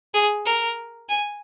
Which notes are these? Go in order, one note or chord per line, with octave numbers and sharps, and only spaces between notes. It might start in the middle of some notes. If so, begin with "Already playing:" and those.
G#4
A#4
G#5